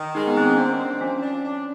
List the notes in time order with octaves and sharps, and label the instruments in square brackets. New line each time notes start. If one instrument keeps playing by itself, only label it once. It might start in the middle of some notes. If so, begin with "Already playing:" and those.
Already playing: [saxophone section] D#3
[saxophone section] G#3 [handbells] D#4
[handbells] B3
[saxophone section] D#3 [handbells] C4
[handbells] C#4
[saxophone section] C4 [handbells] D4
[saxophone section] C4
[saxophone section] F3 [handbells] C#4
[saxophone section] D4
D4